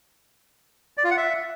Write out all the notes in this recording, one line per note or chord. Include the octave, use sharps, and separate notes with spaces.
D5
F4
F#5
E5